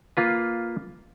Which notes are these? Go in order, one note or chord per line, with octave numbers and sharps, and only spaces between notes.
A#3 F4 B4